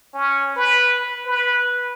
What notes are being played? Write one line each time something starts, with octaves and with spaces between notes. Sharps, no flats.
C#4
B4
B4